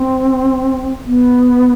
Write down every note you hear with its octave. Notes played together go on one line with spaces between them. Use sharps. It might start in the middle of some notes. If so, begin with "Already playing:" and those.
Already playing: C4
B3